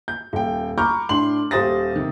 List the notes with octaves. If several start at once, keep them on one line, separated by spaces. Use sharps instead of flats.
G6
D#1 G5
A#5 B5 C#6 D6 F6 G6
A2 D4 C6 F#7
D#1 G4 C5 D#6 A6 A#6
C3 D#3